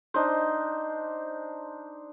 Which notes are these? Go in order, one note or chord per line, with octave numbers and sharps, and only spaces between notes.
D4 D#4 C5